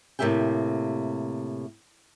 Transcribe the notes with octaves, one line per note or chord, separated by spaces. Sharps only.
A2 C3 A#3 G4 E5 G5